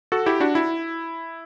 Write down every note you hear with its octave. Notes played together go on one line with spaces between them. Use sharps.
F#4 A4
E4 G4
D4 F#4
E4